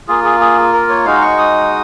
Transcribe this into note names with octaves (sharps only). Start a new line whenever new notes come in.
A#3 F4 G#4
G#4
G#4
A#4
C#5
G#3 D#4 F#4 F5
C#6
D#6